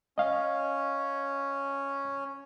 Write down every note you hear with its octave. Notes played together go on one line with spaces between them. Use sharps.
C#4 D#5 F5